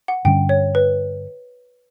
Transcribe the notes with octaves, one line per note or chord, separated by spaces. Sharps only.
F#5
G2 D3 G3 C#4 G5
C#5
B4